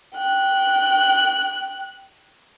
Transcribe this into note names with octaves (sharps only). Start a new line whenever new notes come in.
G5 F#6